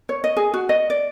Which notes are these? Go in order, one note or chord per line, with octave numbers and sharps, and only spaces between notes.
C#5
D#5
G#4
F#4
D#5
D5